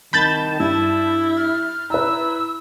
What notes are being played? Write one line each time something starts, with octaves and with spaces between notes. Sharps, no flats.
C2 D#3 A5 B5 G6 A6
G2 E4
F6
E4 B4 A#5 E6